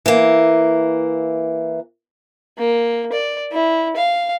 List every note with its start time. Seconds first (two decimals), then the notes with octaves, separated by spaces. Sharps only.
0.06 E3 A#3
2.58 A#3
3.12 D5
3.52 E4
3.97 F5